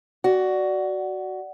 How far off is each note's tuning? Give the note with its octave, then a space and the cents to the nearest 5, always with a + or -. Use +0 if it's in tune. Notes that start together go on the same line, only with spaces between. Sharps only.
F#4 +10 D5 +0